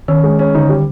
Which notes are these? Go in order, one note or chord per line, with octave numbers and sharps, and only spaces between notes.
D#3 C#4
G#3
C#4
D3 D#4
G3